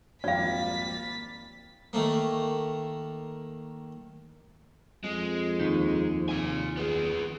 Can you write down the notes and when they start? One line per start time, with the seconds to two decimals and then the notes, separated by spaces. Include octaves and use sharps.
0.24 G#1 F2 G3 A#3 D5 F5 A6 B6
1.93 D#3 A3 A#3
5.04 F2 G#3
5.60 D#2 D#4
6.29 F4 G#5
6.77 B3 G#4